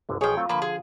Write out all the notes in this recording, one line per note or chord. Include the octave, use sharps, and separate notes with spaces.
G1 C2 D3
B1 F3 G#4 C#5 G5
F#3 A3 C4 F4
D3 F3 A#3 B4
G#4